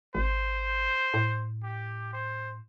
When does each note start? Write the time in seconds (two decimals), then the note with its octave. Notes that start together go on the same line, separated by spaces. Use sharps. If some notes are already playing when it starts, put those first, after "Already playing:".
0.15 G#1 C5
1.14 A2
1.63 G4
2.13 C5